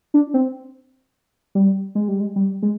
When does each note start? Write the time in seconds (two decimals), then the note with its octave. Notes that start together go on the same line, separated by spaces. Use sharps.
0.14 D4
0.34 C4
1.55 G3
1.95 G#3
2.08 G3
2.21 G#3
2.36 G3
2.62 G#3